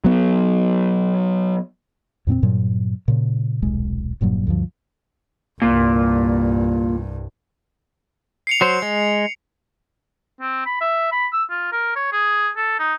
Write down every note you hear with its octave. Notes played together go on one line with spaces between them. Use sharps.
F#3 B3
F2 A#2 B3 C4
G2 A#2 F#3
A#2 C#3
D#1 B1 G#3
E1 G2 A#2 F#3
D2 G2 F3
C2 G2 A#2
C7 C#7 F7
F#3 C5
G#3
C4
B5
E5
B5
E6
F4
A#4
C#5
G#4
A4
D#4